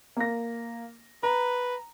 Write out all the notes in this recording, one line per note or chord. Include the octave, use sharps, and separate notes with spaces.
A#3 A#6
B4 A#5